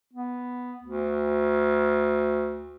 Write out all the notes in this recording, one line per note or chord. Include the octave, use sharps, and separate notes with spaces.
B3
D2